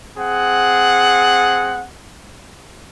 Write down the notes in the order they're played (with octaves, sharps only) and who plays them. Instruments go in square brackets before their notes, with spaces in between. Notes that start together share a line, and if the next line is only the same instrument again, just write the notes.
[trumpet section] C4 G#4 F#5